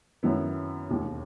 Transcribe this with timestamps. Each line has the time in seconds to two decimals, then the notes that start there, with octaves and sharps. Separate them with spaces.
0.23 F#2 D#3 F#3 B3 E4
0.89 E1 D#2 D#3